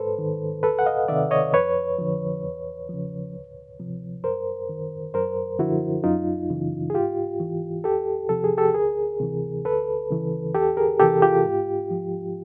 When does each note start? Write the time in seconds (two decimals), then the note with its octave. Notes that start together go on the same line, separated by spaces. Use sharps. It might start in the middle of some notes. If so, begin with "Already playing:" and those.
Already playing: G#2 A4 B4 C5
0.18 D#3
0.63 D2 A4 B4
0.79 F#5
0.86 D#5 F5
1.08 C3 D#3 D5 E5
1.31 C#5 D#5
1.53 F2 B4 C#5
1.98 D3 F3
2.43 E2
2.89 C#3 F3
3.33 D2
3.80 C3 F3
4.23 F#2 A#4 C5
4.69 D#3
5.14 F#2 A#4 C5
5.59 D3 F3 E4 F#4
6.04 F#2 D#4 F4
6.50 C#3 E3
6.90 G#4
6.94 G#2 F4 G4
7.40 E3
7.84 E2 G4 A4
8.29 C3 F3 A4
8.44 G#4
8.57 G4 A4
8.75 D2 G#4 A#4
9.20 C3 E3
9.64 D2 A4 B4
10.10 C#3 E3
10.55 E2 G4 A4
10.77 G#4 A#4
11.00 C3 E3 G4 A4
11.22 F4 G4
11.45 G#2
11.91 F3